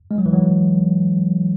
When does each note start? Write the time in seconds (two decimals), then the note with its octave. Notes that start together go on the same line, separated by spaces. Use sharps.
0.11 G#3
0.18 F#3
0.26 E3
0.33 F#3